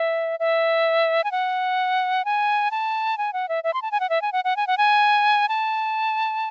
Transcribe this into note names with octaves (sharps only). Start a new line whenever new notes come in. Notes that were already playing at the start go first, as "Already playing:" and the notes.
Already playing: E5
E5
G#5
F#5
G#5
A5
G#5
F#5
E5
E5
C6
A5
G#5
F#5
E5
G#5
F#5
F#5
G#5
F#5
G#5
A5